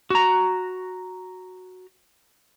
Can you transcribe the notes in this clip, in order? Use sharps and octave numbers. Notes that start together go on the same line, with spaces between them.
F#4 A#5